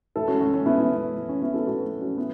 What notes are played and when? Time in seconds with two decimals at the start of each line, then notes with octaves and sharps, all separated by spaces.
0.16 A1 E4 A4
0.28 C#4 F#4
0.41 A1 C#4
0.54 C#4
0.66 A1 B3 E4
0.80 E4
0.92 A1 C#4
1.16 A1
1.29 C#4
1.42 A1 B3 E4
1.54 E4 A4
1.67 A2 F#4 B4
1.93 F#3
2.01 C#4 F#4
2.18 F#3 B3 E4